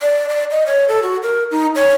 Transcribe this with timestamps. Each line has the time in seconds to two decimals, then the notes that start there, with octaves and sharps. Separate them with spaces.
0.02 D5
0.29 D5
0.51 D#5
0.66 C#5
0.88 A4
1.03 F#4
1.23 A#4
1.51 D#4
1.75 C#5